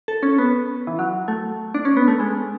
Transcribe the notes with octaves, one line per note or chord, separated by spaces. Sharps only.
A4
C#4
B3
E3
F#3
A3
D4
C#4
B3
A3
G#3